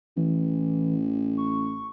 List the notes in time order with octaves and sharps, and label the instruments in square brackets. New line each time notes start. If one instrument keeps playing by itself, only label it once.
[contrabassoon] A1 [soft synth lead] E3
[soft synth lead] C#6